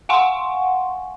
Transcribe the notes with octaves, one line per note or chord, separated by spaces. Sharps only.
F5 F#5 G#5 C6 C#6